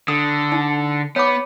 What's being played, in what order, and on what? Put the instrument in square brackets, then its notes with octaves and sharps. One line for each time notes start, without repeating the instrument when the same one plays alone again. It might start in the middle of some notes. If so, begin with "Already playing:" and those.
[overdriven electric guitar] D3 [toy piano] D#6
[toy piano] D#4
[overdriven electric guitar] B3 [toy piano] C#5 B5 D6